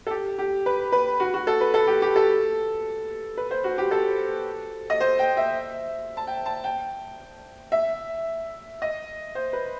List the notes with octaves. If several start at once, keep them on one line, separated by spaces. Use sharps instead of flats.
A4
G4
G4
B4
B4
F#4
F#4
A4
B4
A4
G4
G4
A4
B4
C5
F#4
G4
A4
D#5
C5
G5
E5
A5
G5
A5
G5
E5
D#5
C5
B4